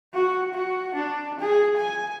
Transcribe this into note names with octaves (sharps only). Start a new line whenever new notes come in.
F#4
F#4
D4
G#4
G#5